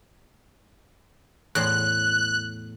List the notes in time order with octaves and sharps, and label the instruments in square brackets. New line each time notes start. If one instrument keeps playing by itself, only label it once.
[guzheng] E2 A2 C6 [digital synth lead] F#6